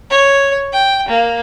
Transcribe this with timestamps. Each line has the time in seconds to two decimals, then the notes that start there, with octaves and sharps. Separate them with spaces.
0.10 C#5
0.73 G5
1.09 A#3